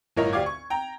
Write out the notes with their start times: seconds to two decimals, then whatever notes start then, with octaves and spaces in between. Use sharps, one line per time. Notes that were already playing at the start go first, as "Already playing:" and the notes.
0.16 G1 A2 A#4 C#5 D#5
0.33 D2 G4 D5 F5 D6 G#6
0.46 C#6
0.70 G5 A#5